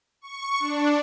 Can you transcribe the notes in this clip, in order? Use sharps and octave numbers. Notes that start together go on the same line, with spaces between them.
C#6
D4